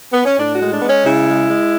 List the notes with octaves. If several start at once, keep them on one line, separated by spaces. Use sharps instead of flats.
B3
C#4
A2 D4
F#4
G#3
D4
G#3 B3
C#4
C#3 E4
G#3
G#3